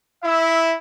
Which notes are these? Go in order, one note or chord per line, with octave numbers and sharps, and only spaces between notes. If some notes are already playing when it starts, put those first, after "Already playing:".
E4 E5